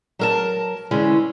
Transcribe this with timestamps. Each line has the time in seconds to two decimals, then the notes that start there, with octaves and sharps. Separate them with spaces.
0.19 F#3 A#4 A5
0.91 D3 E3 G#3 C#4